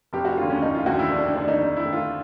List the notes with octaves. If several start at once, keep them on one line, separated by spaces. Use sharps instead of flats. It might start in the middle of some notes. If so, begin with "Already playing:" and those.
F1 G4
F#4
D#2 D3 F4
C#4
F1 D#4
F4
D#2 D3 F#4
E4
F1 D4
D4
D#2 D3 D4
D#4
F1 D#4
E4
D#2 D3
F4